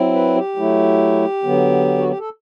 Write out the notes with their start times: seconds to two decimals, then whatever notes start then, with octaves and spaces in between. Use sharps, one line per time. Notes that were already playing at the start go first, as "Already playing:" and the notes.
Already playing: F#3 C4 E4
0.13 B4
0.35 G4
0.56 F#3 A3 E4
1.43 D3 F#3 B3
1.98 F#4
2.08 G4
2.19 A4